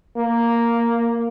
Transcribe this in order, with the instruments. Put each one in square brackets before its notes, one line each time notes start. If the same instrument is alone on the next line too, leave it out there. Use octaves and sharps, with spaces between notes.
[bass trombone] A#3